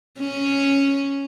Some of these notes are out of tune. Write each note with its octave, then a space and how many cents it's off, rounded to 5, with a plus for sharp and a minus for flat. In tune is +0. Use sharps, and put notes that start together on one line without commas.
C#4 -5